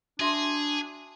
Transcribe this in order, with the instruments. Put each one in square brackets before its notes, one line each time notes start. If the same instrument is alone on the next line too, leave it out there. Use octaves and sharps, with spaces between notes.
[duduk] D4 [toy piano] F#4 E5 C6 [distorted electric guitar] G#4